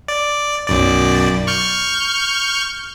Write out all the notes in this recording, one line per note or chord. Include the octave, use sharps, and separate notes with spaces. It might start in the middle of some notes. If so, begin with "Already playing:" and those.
D5
B1 F#2 D5
C#6 F6 G6